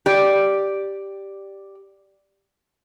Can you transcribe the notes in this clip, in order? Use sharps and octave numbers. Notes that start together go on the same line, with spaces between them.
G4 D5